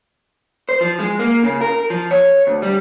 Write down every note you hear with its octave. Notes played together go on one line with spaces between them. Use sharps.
C5
F3
G#3
A#3
C#3
A#4
F3
C#5
D2
G3